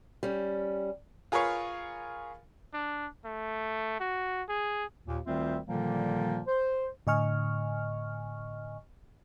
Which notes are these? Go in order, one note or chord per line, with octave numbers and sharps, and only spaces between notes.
G3 C#4
F4 G#4 A#4 B4 C#5 F5
D4
A3
F#4
G#4
D#2 A#2
D2 D#3 G3 C4 F4 E5
A#2 D3 D#3 F3 G3 A#3
C5
A2 D3 D#5 G#5 C#6 F6